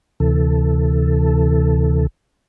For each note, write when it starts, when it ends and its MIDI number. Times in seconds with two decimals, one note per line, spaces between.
0.20 2.07 38
0.20 2.07 48
0.20 2.07 52
0.20 2.07 69